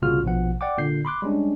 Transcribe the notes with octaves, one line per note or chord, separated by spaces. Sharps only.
C2 A#2 C#3 F4 F#4 F6
A#1 B2 F3 F#5
D5 F#5 G5 D6
A#2 D3 G6 C7
B5 C6 D6 F#6
G3 G#3 C#4 D4